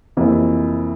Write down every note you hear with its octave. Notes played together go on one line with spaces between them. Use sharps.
F2 C3 E3 A#3